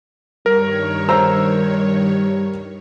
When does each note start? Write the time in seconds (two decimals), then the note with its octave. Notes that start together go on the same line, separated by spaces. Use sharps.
0.46 G2 D#3 G3 A#4 C#5
1.09 C5 A#5 E6